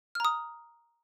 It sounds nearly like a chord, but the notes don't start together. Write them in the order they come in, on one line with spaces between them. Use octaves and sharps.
F6 A#5 D#6